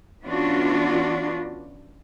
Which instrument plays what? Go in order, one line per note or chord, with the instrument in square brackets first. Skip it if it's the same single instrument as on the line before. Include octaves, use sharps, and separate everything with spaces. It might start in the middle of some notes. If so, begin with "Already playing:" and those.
[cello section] E3 B3 C#4 D4 F4 F#4